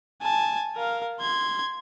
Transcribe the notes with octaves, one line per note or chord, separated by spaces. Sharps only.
G#5 A5
A#4 F5
C6 G#6